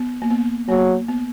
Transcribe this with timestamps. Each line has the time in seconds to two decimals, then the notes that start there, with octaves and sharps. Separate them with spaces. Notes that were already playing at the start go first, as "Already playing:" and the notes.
Already playing: B3
0.22 A#3
0.31 B3
0.69 F#3 A#3
1.08 B3